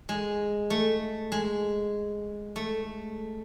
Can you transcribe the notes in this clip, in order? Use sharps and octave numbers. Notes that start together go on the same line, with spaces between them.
G#3
A3
G#3
A3